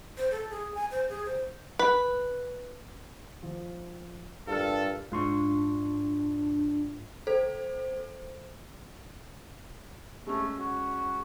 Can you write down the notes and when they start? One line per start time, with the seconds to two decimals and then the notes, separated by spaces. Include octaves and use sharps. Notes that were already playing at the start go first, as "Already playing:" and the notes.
0.17 C5
0.31 A4
0.50 G#4
0.75 G#5
0.91 C5
1.09 G#4
1.25 C5
1.79 B4
3.43 F3
4.48 G2 F4 A4 A#4 F6
5.12 G#2 D4 F4 C6 C#6
7.27 A4 C5
10.27 G#3 A3 C#4
10.59 F#4